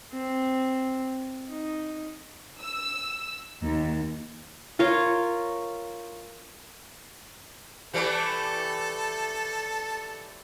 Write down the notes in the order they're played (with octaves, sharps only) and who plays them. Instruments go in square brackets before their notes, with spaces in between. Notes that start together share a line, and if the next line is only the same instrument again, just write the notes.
[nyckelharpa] C4
D#4
[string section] E6
D#2
[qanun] F4 A#4 C#5 F5
[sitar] E3 G3 A3 [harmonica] A4